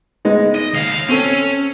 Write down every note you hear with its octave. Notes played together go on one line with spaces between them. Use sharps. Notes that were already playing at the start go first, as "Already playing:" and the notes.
G#3 B3 D#4
D#5
D#2 F5
C4 C#4 A4